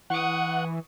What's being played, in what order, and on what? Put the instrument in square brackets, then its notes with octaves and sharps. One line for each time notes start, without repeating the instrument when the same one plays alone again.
[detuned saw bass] E3 [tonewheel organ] F#5 [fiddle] C#6 D#6